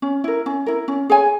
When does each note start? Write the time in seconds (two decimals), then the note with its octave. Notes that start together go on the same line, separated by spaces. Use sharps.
0.02 C#4
0.24 E4 A#4
0.46 C#4
0.66 E4 A#4
0.88 C#4
1.10 G#4 C#5 G#5